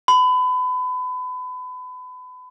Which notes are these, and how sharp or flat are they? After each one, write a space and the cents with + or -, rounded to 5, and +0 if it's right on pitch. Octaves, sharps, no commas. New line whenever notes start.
B5 +30